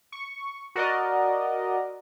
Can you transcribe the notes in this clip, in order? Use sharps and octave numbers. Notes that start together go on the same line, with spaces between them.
C#6
F#4 A#4 D5 D#5